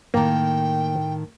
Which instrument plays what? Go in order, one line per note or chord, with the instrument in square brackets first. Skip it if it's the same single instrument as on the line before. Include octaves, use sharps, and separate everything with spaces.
[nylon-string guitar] A2 D#3 [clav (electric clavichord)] A#3 [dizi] G5